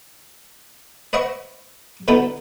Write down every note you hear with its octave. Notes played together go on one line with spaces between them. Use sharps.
B4 C5 D#5 E5 F#5 C#6
B2 D3 B3 D#4 E4